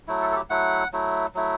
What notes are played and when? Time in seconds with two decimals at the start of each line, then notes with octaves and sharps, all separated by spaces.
0.07 F#3 A3 E4
0.21 A4
0.31 A4
0.36 G4
0.50 F#3 A3 E4 F#5
0.93 F#3 A3 E4
1.35 F#3 A3 E4